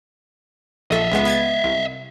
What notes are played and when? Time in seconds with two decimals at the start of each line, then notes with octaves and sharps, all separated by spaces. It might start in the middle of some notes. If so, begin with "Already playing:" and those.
0.91 A#1 A4 D#5 E5
1.12 C#2 G#3 B3
1.25 B3 G#6 A6
1.64 C2